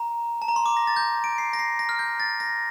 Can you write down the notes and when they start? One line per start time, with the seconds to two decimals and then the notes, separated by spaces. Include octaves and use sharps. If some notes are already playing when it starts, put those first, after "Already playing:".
Already playing: A#5
0.42 A5
0.48 A#5
0.56 C6
0.66 D6
0.77 A#6
0.87 A6
0.96 G6
1.24 D7
1.38 C7
1.53 A#6
1.59 C7
1.79 A#6
1.89 F6
1.99 G6
2.20 A6
2.40 A#6